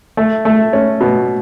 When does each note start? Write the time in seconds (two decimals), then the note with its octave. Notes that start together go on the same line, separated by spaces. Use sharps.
0.17 A3
0.45 A3
0.73 C#4
1.01 B2